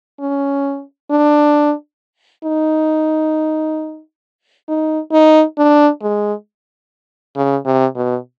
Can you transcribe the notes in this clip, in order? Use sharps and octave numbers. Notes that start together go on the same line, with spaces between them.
C#4
D4
D#4
D#4
D#4
D4
G#3
C#3
C3
B2